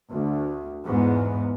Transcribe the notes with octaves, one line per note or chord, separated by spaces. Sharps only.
D2
E2 G#2 B3